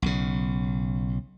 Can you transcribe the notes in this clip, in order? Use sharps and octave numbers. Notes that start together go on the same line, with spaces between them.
B1 C#3